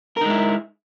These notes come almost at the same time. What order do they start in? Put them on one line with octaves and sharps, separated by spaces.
A#4 D#4 G#3 E4